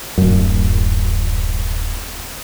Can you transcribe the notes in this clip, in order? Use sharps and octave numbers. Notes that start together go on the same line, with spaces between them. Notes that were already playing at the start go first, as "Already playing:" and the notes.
D1 F#2